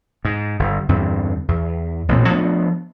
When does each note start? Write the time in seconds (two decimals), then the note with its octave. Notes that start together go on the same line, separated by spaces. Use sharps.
0.25 G#2
0.59 G1
0.89 E2 G2 D3 C4
1.48 E2
2.09 A1 G2 A#2 C4
2.30 F3 A3 B3 D4